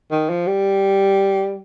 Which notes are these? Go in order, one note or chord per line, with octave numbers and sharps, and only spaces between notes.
D#3
F3
G3